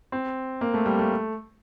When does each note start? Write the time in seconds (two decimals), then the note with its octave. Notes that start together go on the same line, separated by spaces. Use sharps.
0.12 C4
0.61 A#3
0.74 A3
0.86 G3
0.99 A3